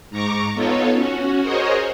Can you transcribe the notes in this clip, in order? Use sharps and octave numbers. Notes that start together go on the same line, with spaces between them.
G#2 A#5 C#6 D6
B3 D#4 F4 A4 C#5
C#4 F#4
F#4 G#4 A#4 C5 C#5 D#5